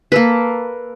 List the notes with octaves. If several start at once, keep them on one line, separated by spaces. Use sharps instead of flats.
A#3 A4 B4